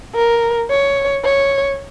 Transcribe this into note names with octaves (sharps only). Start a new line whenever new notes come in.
A#4
C#5
C#5